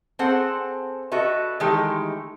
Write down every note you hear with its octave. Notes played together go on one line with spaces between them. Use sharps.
C4 G#4 A4 C5 F#5
F#4 A4 B4 D#5 E5
D#3 E3 G#3 A3 G4 A4